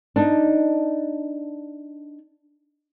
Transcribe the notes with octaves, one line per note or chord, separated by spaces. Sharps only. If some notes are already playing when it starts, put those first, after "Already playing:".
D4 D#4